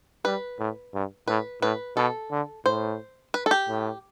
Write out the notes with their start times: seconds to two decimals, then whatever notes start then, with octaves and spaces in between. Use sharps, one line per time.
0.25 G3 B4
0.59 A2
0.94 G2
1.28 A2 B4
1.62 A2 B4
1.97 B2 A4
2.31 D3
2.66 A2 C5
3.34 B4
3.46 A4
3.51 G4
3.69 A2